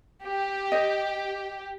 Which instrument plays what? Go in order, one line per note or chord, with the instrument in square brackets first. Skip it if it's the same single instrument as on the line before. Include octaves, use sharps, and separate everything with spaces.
[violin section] G4
[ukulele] C5 D#5